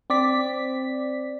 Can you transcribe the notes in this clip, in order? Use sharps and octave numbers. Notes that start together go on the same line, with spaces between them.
C4 D5 B6